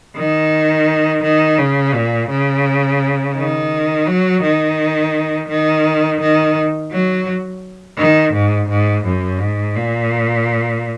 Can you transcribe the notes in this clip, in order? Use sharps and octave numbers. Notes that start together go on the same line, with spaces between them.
D#3
D#3
C#3
A#2
C#3
D#3
F#3
D#3
D#3
D#3
F#3
D#3
G#2
G#2
F#2
G#2
A#2